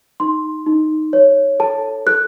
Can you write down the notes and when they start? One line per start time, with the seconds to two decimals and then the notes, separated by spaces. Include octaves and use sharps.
0.20 D#4 C6
0.66 D#4
1.13 C#5
1.60 A4 A5
2.06 A4 F#6